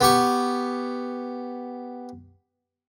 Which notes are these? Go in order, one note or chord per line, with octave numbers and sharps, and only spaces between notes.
B3 G4 C#6